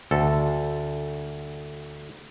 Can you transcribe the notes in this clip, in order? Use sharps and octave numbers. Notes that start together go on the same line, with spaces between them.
D2 A4